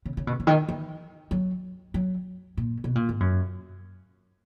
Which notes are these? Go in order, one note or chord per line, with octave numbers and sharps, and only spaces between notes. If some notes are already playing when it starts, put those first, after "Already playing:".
C#3
C#3
B2
C#3
D#3
E3
F#3
F#3
A#2
B2
A#2
G#2
F#2